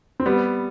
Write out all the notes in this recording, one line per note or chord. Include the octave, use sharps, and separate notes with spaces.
C4
G3 B3